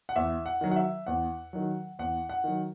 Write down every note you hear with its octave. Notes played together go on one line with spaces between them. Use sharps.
F#5
E2 E5
F#5
D#3 F#3
F#5
E5
E2 F#5
D#3 F#3
E2 F#5
F#5
D#3 F#3